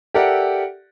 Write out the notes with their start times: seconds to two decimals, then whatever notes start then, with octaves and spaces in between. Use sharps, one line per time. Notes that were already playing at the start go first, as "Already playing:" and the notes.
0.14 G4 A4 A#4 D5 E5 F#5